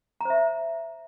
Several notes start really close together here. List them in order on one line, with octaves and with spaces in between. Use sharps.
A#5 C5 E5